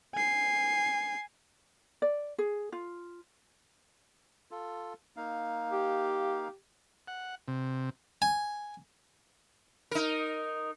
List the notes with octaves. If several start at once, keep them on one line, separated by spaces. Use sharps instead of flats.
G#5 C7
D5
G#4
F4
F4 A4
A#3 D#4 F5
G4
F#5
C3
G#5
D#4 A#4